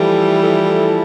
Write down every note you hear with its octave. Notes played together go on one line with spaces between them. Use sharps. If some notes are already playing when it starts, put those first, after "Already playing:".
Already playing: E3 F3 G3 A3 E4 A4
F3 A3 E4 A4